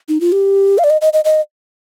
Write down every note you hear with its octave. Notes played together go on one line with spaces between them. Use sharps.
D#4
F4
G4
F5
D5
D#5
D#5
D#5
D#5